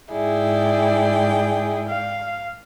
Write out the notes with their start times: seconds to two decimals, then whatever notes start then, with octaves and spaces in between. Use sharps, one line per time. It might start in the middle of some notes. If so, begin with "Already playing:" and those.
0.13 G#2 E4 G#4 D5 G5
1.88 F5